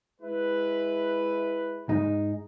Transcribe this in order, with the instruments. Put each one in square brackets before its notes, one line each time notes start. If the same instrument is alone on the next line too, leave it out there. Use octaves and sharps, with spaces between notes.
[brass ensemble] G#3 E4 B4
[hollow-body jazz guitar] G#2 G#3 D#4